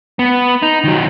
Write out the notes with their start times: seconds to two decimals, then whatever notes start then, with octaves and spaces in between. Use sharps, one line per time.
0.19 B3
0.62 D#4
0.85 D#3 F#3